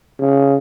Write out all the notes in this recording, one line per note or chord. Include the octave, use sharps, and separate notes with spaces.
C#3